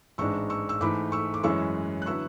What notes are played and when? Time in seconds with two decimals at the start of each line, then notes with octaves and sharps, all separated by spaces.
0.18 A1 G#2 G#3 D4 C#6 E6
0.50 C#6 E6
0.69 E6
0.81 G#2 E3 A3 B5 D6
1.12 C#6 E6
1.34 D6
1.43 F#2 E3 G#3 C#4 E4 C#6 E6
2.02 F#6
2.06 D3 F#3 B3 E4 C#6 E6